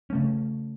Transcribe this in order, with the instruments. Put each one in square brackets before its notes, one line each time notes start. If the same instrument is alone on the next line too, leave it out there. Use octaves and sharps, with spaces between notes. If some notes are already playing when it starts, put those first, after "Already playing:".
[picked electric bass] C#3 A3 C#4